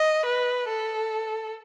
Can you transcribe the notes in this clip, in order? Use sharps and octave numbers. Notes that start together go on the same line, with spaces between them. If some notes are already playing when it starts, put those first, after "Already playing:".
Already playing: D#5
B4
A4